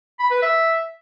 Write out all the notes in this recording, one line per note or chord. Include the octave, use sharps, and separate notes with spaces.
B5
B4
E5